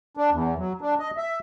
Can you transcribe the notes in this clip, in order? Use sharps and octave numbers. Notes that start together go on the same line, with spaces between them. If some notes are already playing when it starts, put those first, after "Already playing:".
D4
E2
F#3
D4
D#5
E5